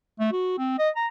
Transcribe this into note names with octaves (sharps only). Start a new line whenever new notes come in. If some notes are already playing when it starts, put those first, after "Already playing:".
A3
F#4
C4
D#5
A#5